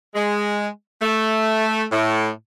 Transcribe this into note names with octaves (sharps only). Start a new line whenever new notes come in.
G#3
A3
A2